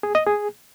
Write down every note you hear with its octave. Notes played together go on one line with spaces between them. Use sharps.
G#4
D#5
G#4